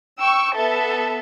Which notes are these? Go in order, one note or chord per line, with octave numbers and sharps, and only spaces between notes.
G5 C#6 E6
B3 A4 E5